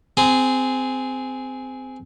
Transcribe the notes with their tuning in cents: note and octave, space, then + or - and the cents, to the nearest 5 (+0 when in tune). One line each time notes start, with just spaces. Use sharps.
C4 -20 G#4 +0